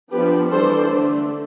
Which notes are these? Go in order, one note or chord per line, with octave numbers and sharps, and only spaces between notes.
F3 B3 D4 G4 B4
E3 G3 D4 A4 C5
D3 A3 D4